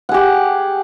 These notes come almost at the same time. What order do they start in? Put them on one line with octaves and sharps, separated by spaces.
F#5 G#4 G4